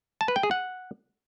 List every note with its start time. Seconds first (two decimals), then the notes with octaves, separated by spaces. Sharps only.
0.21 A5
0.28 B4
0.36 G5
0.43 G#4
0.51 F#5